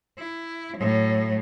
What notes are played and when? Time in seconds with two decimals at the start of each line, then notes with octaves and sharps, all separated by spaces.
0.18 E4
0.77 A2 F#3